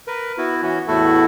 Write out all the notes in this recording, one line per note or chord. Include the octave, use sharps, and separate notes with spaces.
A#4 B4
B3 E4 F#4
E3 C#4 F#4
E2 A2 A3 E4 F#4 A4